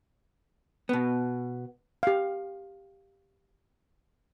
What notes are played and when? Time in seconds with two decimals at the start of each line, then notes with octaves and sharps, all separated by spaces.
0.89 B2 B3
2.03 G4 F5